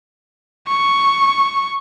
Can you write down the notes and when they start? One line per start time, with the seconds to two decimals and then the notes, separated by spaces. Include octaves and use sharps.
0.67 C#6